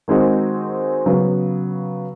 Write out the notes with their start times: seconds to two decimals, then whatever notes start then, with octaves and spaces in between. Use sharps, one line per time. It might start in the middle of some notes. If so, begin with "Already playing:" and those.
0.08 D#3 G#3 C4 D#4 F#4
1.06 C#3 F#3 B3